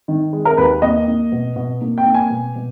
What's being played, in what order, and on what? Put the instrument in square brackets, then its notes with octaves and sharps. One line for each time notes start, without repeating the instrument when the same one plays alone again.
[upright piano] D#3
G#3
A#4
D#2 B4
A#3 D#5
A#3
B2
B2
A#3
G5
A#3
G#5
B2
B2